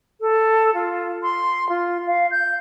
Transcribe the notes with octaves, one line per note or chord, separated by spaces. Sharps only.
A4
F4
C6
F4
F5
G6